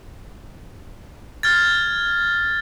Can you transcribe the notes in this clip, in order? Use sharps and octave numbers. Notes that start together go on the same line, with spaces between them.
F6 G#6 A6